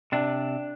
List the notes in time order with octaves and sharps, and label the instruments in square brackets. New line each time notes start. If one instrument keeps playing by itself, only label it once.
[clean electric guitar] C3 D4